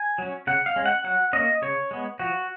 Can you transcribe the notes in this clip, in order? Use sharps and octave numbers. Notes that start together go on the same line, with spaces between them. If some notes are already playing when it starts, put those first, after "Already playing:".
Already playing: G#5
F#3 C#4
C#3 F#5
F5
G#3 C#4
F#5
F#3 F#5
A#3 C#4 D#5
C#3 C#5
G#3 B3
F3 F#4